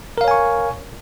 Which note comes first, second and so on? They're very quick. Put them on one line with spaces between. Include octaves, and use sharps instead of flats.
A#4 F5 C#5 G#5 C#6